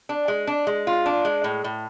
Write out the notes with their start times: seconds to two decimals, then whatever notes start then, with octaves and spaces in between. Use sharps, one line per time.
0.09 D4
0.28 G#3
0.47 D4
0.67 G#3
0.87 F4
1.06 D4
1.25 G#3
1.44 A2
1.64 A2